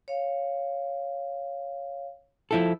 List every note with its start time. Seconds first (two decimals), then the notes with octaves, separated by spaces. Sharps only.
0.08 C#5 F5
2.51 F3 E4 A4